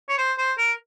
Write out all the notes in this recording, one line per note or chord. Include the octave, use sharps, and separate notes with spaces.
C#5
C5
C5
A#4